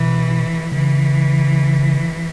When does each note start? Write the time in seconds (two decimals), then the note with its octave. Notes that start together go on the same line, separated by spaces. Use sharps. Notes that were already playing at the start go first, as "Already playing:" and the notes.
Already playing: B2 E3
0.72 C#3 E3